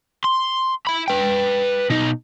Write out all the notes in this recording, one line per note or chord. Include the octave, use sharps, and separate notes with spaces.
C6
E4 B5
B4 G5
B2 D#4